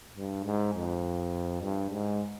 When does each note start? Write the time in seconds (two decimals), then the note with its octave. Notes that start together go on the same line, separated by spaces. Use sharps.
0.16 G2
0.45 G#2
0.74 F2
1.61 G2
1.90 G#2